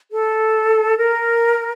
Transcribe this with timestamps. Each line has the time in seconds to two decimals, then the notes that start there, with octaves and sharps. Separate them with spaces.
0.11 A4
0.98 A#4